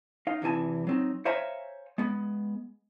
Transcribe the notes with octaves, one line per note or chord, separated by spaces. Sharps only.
D#4 F5
E2 C3 E3 G#5 A5
F#3 C4 D#4
C5 C#5 E5 F5 G#5 A#5
G#3 B3